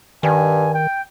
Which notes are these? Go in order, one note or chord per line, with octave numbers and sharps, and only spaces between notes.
G2 D#3 G#5
G5